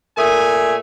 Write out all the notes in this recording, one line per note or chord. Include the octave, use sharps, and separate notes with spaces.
A#2 A3 A#4 E5 G#5 D#6